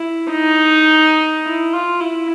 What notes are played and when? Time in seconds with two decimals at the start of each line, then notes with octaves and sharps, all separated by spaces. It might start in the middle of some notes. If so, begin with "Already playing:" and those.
Already playing: E4
0.32 D#4
1.45 E4
1.73 F4
2.01 E4